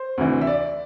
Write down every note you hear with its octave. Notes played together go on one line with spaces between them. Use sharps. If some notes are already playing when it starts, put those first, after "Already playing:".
Already playing: C5
D2 C3 E3
E5
D5